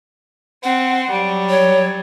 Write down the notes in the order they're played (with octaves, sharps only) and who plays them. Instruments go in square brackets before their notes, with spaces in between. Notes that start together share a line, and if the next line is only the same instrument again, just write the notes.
[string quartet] C4 [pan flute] F#5
[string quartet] F#3 G3
[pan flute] C#5